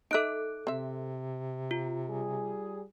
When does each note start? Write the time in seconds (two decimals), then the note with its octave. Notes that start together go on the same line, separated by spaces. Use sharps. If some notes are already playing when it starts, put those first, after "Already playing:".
0.11 D#4 A4 E5 F#6 D7
0.67 C3 C4 E5
1.71 F4
2.08 G3 G#4